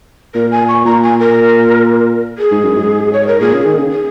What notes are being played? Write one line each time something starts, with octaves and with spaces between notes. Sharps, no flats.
A#2 A#4
G#5
C#6
A#2 A#5
G#5
A#4
G#4
G#2
F#2
G#2
C#5
A#4
A#2 G#4
C#3
D#3
C#3
G#4